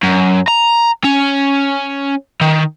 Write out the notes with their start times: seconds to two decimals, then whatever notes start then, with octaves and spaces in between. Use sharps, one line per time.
0.03 F#2
0.48 A#5
1.04 C#4
2.41 D#3